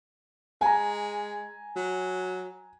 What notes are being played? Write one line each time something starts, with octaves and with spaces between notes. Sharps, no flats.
G#3 G#5 A#5
F#3